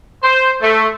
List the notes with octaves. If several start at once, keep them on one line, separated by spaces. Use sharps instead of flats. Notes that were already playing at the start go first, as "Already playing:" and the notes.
C5
A3